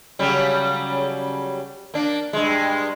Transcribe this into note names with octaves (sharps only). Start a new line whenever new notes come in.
C#3 F#3 G3
A#3 D4
G2 G#3